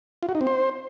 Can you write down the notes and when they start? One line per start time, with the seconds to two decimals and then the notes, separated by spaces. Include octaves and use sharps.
0.23 F4
0.29 F#4
0.35 D#4
0.41 C4
0.47 C5